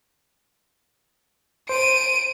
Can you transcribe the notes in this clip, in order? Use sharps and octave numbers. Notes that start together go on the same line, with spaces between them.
C5 D7 D#7